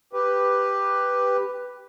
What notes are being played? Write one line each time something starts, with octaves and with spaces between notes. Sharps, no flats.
G4 B4